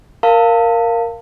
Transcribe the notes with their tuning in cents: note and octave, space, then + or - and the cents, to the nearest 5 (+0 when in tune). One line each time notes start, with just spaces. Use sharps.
A#4 +0 F5 +0 A5 +35